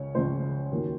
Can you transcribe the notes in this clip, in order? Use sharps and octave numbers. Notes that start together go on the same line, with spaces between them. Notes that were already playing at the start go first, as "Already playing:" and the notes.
Already playing: C#2 C#3 C#5
C#2 C#3 F3 C5
D#2 D#3 F#3